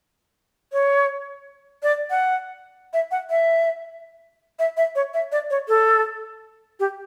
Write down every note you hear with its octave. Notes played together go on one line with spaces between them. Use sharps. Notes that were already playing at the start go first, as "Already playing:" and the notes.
C#5
D5
F#5
E5
F#5
E5
E5
E5
C#5
E5
D5
C#5
A4
G4